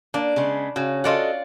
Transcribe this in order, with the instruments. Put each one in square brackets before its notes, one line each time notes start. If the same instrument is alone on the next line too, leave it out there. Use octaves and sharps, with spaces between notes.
[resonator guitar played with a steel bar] A#3 [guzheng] D4
[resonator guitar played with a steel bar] C#3 G#3 B3
[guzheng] C#3 [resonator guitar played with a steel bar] F#4
[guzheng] F4 D5 F#5 [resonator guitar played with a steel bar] F#4 A4 D#5